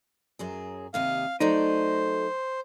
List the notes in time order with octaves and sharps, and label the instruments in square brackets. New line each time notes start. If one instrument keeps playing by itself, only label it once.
[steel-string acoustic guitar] F#2 F#3 G#4
[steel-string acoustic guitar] D#2 C3 D#5 [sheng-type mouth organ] F5
[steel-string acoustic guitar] F#3 A3 D5 [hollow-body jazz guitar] D#4 [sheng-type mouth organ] C5